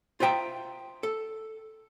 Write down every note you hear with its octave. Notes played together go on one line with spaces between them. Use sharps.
F4 C5 E5 G5 A#5
A4